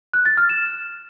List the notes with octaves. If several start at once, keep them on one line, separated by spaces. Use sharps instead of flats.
F#6
A6
F6
E7